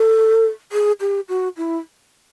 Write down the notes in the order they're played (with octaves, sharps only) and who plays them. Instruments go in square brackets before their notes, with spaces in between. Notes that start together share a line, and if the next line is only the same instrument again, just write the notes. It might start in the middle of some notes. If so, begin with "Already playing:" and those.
Already playing: [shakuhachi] A4
G#4
G4
F#4
E4